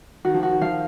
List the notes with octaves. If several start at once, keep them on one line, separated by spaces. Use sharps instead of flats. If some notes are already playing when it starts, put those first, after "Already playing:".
D#3 F#4
F3
D#3 F#4
F3 F5